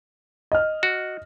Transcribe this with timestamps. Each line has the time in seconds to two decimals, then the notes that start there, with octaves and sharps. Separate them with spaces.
0.52 D#5 F6
0.83 F#4